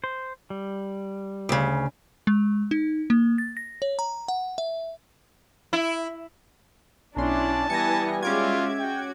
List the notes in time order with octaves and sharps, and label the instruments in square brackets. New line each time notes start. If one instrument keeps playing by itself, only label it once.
[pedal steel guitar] C5
G3
[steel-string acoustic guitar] D2 C#3
[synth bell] G#3
D#4
A#3
A6
A#6
C#5
A#5
F#5
E5
[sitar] E4
[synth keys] B1 C6 [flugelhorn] C#4 [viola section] D4 E4 D5 [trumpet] A5
[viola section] E3 B3 G#5 [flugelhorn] G3 [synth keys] A#6 C#7
[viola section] G#3 F#4 E5 [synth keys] C#4 D6 G#6 [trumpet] F4
[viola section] F#4 [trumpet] G5